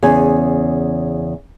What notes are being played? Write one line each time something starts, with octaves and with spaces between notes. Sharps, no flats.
E2 C#3 G#5